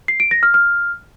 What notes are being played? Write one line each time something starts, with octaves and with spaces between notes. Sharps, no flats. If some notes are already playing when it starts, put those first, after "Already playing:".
C7
D7
A#6
F6
F6